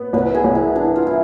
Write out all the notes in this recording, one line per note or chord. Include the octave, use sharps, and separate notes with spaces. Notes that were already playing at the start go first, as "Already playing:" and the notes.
Already playing: B3
C2 B4
G#4
C2
E4
E3 D4
F4
E3 E4